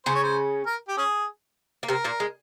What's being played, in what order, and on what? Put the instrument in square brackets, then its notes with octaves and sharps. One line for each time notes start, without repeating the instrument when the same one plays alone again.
[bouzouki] C#3 C#4 [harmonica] C5
[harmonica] C#5
C5
A#4
G4
C#4 G#4
[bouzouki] A#3
[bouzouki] C3 C4 [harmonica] A#4
[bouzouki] A#2 A#3
G#3